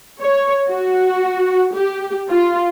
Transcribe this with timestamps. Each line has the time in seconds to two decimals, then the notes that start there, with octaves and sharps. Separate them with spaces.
0.20 C#5
0.69 F#4
1.74 G4
2.30 F4